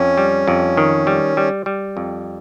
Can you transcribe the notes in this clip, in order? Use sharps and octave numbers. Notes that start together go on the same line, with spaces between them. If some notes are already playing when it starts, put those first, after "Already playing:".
Already playing: F2 C#4
G3
F2
D#3
G3
G3
G3
F2